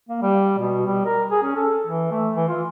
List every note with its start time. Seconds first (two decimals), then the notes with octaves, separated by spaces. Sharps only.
0.09 A#3
0.22 G3
0.59 B2
0.86 G3
1.05 A#4
1.31 G#4
1.43 C#4
1.56 A4
1.87 E3
2.11 A3
2.35 E3
2.49 F4